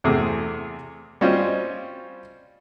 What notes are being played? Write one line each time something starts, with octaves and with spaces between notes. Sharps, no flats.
E2 C3 A3 G#4
G3 C4 C#4 F4 C5 D#5